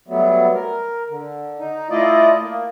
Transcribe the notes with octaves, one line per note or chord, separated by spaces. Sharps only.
F#3 G3 A3 B3
A#4
D3
D#4
A3 E4 F4 D5 D#5
A#3